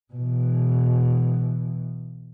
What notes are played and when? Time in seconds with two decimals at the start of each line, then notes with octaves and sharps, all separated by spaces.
0.13 B2 E3